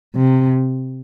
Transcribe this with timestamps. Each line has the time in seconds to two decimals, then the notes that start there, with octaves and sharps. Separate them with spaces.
0.16 C3